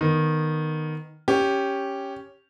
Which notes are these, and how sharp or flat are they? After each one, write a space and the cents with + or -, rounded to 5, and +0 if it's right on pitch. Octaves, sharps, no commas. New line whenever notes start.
D#3 -5 B3 +0
C#4 +0 G4 +0